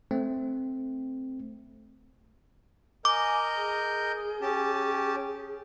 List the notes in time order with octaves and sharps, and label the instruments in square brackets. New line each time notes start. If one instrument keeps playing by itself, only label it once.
[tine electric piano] A3 C4
[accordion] A#4 D#5 G6 [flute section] G#5 D#6 [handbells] D6
[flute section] G#4
[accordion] C#4 G4 A5